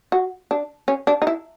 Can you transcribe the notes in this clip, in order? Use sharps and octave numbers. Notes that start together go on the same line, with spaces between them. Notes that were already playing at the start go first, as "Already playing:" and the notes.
F#4
D4
C#4
D4
D#4
E4